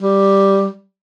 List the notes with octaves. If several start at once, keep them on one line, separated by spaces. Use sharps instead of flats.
G3